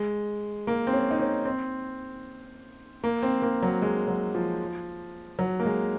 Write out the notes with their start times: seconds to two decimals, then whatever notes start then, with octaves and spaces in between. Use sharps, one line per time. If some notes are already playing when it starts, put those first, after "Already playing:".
Already playing: G#3
0.67 A#3
0.87 C4
0.93 C#4
1.11 D#4
1.19 C#4
1.45 C4
3.04 A#3
3.23 C4
3.42 A#3
3.63 F#3
3.82 G#3
4.08 F#3
4.35 F3
5.39 F#3
5.60 A#3
5.65 G#3